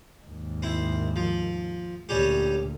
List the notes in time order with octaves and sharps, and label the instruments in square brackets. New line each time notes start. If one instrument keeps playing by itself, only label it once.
[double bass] D#2 G#2
[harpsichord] C4 E4
F3
[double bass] D2 A#2 [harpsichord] G3 C#4 G4